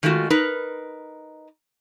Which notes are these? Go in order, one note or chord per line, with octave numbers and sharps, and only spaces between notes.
D#3 G#3 A3 F4 F#4
D#4 A#4 B4